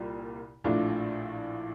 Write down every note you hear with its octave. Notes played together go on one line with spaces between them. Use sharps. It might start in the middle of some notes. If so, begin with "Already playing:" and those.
Already playing: C2 A#2 G3
A#1 A2 A3 D4 F4